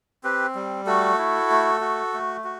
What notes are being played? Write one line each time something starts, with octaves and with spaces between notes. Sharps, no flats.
C4 G4 B4
G3
A3 F#4 A4
E4
A3
F#4
A3
F#4